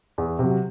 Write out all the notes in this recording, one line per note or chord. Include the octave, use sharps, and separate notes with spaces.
E2
C3 F#3